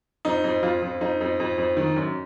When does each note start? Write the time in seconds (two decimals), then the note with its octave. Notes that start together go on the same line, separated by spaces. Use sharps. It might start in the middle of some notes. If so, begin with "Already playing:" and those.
0.25 F2 D#4
0.44 F2
0.63 F2 F4
0.83 F2
1.01 F2 D#4
1.21 F2
1.40 F2
1.58 F2
1.77 D#3
1.96 F#2